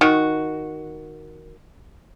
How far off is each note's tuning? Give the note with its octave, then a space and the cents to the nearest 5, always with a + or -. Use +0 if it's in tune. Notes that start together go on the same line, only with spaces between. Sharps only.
D#3 +5 F#4 +0